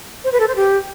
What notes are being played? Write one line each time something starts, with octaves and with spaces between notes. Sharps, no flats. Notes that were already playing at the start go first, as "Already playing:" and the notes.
C5
B4
A4
C5
G4